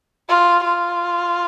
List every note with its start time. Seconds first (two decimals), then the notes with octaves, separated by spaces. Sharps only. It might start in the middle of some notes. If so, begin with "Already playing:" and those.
0.29 F4
0.64 F4